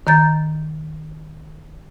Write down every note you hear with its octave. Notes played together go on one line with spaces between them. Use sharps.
D#3 A#5 G6 A6